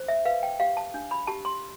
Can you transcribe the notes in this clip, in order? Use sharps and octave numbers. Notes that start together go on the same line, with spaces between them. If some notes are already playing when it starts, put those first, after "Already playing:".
Already playing: C5
E5
B4 F5
G5
G4 F5
A5
D4
B5
G4 A5
C6